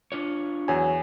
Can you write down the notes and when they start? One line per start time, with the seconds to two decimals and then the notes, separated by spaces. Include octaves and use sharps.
0.12 D4 F4 C#5
0.68 E2 F#3 G#5